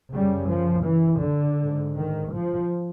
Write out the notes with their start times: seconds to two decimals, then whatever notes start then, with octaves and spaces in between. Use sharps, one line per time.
0.15 F#2 C#3 G3
0.51 F3
0.87 E3
1.24 D3
1.60 G#2
1.96 D#3
2.32 F3